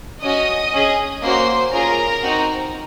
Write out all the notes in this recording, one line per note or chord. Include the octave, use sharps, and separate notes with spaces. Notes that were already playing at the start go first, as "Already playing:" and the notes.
C#4 F#4 D#5 D#6
C#4 G#4
A#3 C#4 F#4 C5 C6
C#4 F4 G#4 A#4 A#5
C4 D#4 F#4